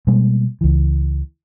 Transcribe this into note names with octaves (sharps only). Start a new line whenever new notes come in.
B2 G3 G#3 A#3
C#2 E3